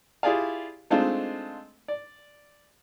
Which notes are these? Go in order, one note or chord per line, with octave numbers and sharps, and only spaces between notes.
E4 F4 G4 G#4 D5 F5
G#3 A3 C4 D4 D#4 F4
D5